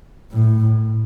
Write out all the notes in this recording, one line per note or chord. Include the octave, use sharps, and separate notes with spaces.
A2